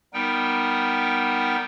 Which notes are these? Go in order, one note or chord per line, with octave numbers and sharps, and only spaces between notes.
G3 B3 D#4 A#4 G5